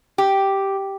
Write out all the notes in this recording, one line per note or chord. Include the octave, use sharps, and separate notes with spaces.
G4